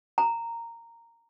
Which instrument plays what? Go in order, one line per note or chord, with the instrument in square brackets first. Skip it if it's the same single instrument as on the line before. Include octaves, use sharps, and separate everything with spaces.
[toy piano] A#5